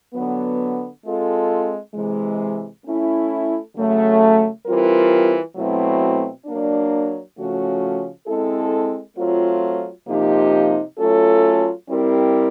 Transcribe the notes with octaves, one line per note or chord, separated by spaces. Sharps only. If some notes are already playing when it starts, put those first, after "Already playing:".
D3 F#3 B3
G#3 C4 F4 A4
C3 E3 G#3
A3 C#4 E4
C#3 F#3 A3
E3 G3 C4 F4 A#4
B2 F#3 A3 C4 E4
F#3 A#3 D4
C#3 F3 A3 C#4 F#4
G#3 C4 E4 A4
F#3 A3 C4 F4
C3 F3 A#3 D#4 G4
F#3 A3 C#4 F4 A4
G3 C4 E4 G4 A#4